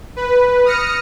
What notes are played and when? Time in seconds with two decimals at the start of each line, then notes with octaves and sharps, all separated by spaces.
0.16 B4
0.65 D#6 F6 A#6 C#7